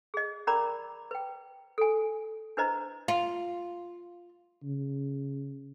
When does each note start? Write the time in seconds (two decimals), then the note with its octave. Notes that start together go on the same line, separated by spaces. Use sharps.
0.14 G#4 D#5
0.47 C#4 A#4 D5 A#5 B5 D6
1.11 B4 G5
1.78 A4 G#5
2.57 D4 E4 B4 C5 D#5 A#5
3.08 F4
4.63 C#3